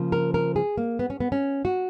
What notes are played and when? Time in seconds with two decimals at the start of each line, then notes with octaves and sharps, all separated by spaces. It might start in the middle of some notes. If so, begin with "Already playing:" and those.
Already playing: C#3 F3 A#3
0.12 A#4
0.34 A#4
0.56 G#4
0.78 A#3
0.99 B3
1.10 C#4
1.20 B3
1.32 C#4
1.65 F#4